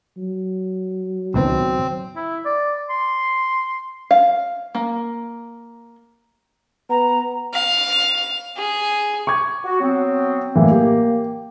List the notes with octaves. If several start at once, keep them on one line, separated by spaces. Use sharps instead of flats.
F#3
C#2 B2 D#3 C4
E4
D5
C6
F5
A#3
B3 A#5
F5
G#4
C#6 D6 G#6
F#4
F#3 B3 C4
A2 E3 A#3
G4